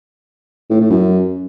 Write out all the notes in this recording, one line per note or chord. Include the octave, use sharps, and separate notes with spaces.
A2
A2
F#2